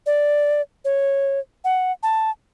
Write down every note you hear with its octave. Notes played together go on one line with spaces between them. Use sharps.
D5
C#5
F#5
A5